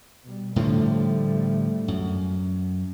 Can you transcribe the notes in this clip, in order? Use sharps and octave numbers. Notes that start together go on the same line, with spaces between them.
B2 G3
A2 D3 F3 G3 A3
F#2